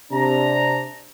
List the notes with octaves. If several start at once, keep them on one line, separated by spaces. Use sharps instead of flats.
C3 D4 A#5